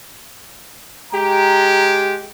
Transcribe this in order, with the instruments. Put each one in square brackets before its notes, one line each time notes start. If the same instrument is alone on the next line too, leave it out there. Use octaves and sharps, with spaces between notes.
[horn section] G#3 G4 [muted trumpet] A#5